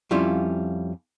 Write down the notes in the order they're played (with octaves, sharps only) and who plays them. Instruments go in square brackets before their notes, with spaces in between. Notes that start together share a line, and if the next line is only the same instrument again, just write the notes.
[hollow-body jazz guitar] F2 G3 C#4 E4 F4